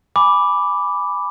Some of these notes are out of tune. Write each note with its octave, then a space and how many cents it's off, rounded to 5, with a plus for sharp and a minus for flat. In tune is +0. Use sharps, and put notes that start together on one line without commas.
G#5 -10 B5 +0 D6 +0